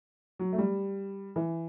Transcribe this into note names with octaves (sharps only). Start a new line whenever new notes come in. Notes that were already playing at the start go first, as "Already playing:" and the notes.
F#3
A3
G3
E3